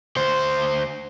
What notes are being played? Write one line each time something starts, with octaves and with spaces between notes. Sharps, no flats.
D2 C5